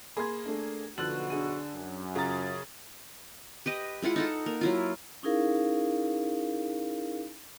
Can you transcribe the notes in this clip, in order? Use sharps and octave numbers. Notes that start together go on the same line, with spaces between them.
A#3 G#4 B5 C6 G#6
A3 D4
B1 D3 F3 B3 F#4 F#6 A6 F#7
D4 G#4 D#7
F#2
C#3 F4 A#5 A6
G4 B4 D#5
G#3 E4 F4 F#5
D#4 A4 F#5
A#3
F#3 E4 F4
C#4 D#4 E4 G#4 A#4 F5